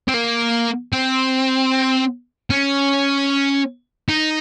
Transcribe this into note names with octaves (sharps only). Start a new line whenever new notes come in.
C4
A#3
C4
C#4
D#4